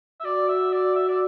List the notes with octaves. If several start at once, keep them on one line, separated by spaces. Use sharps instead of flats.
E5
F#4 D5
E5
D5
E5
D5